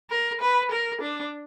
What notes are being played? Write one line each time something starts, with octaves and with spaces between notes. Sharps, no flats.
A#4
B4
A#4
D4